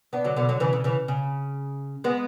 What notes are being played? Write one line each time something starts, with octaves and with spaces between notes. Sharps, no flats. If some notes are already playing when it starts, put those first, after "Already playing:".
B3 D4
D3 F#3
B2 D3
D3 F#3
C#3 E3
C#3
C#3 E3
C#3
G#3 B3